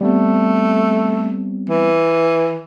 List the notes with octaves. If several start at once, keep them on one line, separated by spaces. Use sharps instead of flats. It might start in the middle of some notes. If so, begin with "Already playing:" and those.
G3 A3 B3 C4
E3